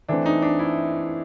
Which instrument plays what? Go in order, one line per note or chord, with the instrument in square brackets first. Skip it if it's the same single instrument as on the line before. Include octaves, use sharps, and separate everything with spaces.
[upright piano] E3 A3 C4 [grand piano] D4
[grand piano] D#4
D4
E4